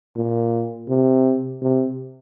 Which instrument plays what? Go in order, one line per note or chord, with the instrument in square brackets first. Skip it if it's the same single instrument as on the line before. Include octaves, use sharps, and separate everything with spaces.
[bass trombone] A#2
C3
C3